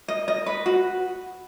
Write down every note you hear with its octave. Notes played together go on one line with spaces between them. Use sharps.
D#5
D#5
B4
F#4